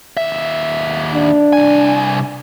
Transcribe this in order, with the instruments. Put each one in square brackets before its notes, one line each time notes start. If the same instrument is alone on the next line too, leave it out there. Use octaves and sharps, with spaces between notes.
[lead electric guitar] D#2 E5
[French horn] D4
[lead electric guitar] C2 G#5